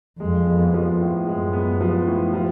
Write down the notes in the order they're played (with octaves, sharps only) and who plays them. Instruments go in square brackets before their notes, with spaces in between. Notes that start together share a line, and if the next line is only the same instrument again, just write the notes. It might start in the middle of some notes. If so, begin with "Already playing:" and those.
[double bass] F2 [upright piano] G#3
[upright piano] B3
F3
A2
[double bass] F#2 [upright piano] G#3
[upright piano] B3
F3
A2
F3